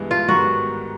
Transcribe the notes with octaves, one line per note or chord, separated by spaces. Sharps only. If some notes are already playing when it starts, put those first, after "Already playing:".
Already playing: G2 E3 G#3 B3
F4
G#2 D#3 G3 B3 F#4